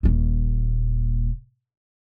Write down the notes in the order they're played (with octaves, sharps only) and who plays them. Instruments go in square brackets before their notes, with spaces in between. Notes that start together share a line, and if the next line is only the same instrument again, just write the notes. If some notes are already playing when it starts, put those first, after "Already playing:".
[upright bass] D#1 A#2